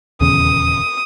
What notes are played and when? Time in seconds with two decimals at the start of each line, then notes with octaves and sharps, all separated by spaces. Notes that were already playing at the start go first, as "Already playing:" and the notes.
0.21 D#1 E2 C#3 D#6